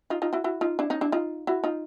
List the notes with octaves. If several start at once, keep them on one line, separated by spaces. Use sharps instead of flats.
D#4 F4
D#4 F4
E4 F#4
E4 F#4
D#4 F4
D4 E4
C#4 D#4
D4 E4
D#4 F4
E4 F#4
D#4 F4